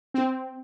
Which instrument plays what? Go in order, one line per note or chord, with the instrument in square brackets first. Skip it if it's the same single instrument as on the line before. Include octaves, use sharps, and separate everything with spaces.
[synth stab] C4